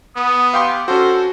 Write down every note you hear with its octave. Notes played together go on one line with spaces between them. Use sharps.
B3 D#6
G4 F5 G5 C6
C#4 F#4 A4 C5